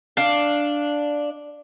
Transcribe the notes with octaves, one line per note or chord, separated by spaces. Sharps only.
D4 F5